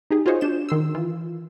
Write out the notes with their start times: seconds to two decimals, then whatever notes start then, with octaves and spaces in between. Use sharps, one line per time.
0.11 D#4 G4 G#4
0.26 F4 F#4 G#4 C5 C#5 D#5
0.41 D4 G6 E7
0.69 D#3 C6 E6
0.95 E3 F4